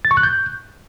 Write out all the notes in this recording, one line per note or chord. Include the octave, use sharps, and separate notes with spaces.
A6
C#6
F#6
G6